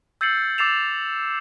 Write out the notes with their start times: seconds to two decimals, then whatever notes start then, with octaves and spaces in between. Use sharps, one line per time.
0.21 E6 G6 A6 C7 C#7 F#7
0.58 D6 E6 A6 C7 E7 F7